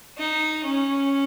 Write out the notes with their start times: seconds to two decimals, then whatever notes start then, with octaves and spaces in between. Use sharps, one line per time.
0.18 D#4
0.65 C#4